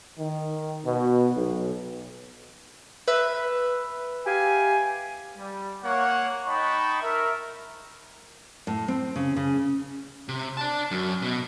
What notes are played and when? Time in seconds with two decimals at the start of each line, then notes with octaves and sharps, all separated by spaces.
0.19 D#3
0.85 B2
1.33 B1
3.08 B4 E5
4.27 G4 F5 G#5
5.37 G3
5.83 A#3 C#5 F#5
6.47 D#4 D#5 G5 A5 B5 C#6
7.01 A#4 E5
8.67 A2
8.88 C4
9.16 C#3
9.36 C#3
10.28 C3
10.57 D5 A5
10.91 F#2
11.22 B2